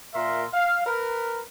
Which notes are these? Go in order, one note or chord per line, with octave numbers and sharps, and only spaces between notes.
A#2 A#4 E5 C6
F5
A#4 B4